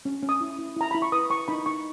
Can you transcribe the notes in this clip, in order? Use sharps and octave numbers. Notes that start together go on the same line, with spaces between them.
C#4
C#4
D#6
E4
E4
E4 A#5
E4 B5
C#6
B4 D#6
E4 C#6
D#4 B5
D#4 C#6